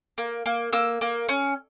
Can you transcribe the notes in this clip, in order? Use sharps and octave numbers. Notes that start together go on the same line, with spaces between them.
A#3
A#3
A#3 E6
A#3
C#4